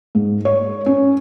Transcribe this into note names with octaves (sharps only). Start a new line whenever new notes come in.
G#2
C#5
C#4